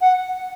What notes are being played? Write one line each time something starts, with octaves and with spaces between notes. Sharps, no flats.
F#5